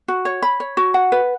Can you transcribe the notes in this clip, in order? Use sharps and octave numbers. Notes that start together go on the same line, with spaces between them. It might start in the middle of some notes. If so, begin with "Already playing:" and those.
F#4
C#5
B5
C#5
F#4
F#5
B4